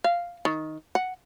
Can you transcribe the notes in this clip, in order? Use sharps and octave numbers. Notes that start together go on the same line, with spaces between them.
F5
D#3
F#5